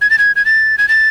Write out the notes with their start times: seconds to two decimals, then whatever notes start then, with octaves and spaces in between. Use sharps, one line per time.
0.01 G#6
0.10 A6
0.18 G#6
0.36 G#6
0.45 A6
0.78 G#6
0.89 A6